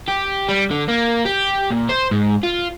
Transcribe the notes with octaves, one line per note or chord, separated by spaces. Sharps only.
G4
G3
D3
A#3
G4
A#2
C5
G#2
F4